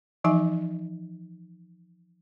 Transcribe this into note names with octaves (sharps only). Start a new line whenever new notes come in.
E3 F3 D#4 E5 G#5